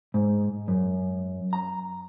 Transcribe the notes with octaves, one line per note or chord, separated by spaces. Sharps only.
G#2
F#2
A#5